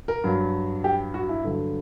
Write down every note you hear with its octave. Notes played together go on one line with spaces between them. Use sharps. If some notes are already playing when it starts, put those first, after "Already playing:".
A#4
G2 F#3
G4
F#4
E4
G2 D3 F#3